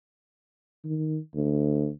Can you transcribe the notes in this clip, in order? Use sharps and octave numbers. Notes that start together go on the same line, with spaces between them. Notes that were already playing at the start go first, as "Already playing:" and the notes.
D#3
D2